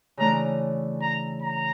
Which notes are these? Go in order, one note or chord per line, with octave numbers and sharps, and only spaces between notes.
C#3 E3 A3 D4 A#5
A#5
A#5